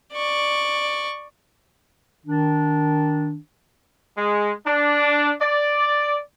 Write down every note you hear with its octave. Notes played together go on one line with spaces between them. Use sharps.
D5 C#6
D#3 D4
G#3
D4
D5